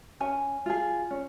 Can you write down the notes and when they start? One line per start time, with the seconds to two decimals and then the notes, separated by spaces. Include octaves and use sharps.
0.20 C#4 G#5
0.66 F4 G#4
1.11 C#4